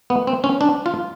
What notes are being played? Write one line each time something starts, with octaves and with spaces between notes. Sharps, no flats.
B3
C4
C#4
D4
F4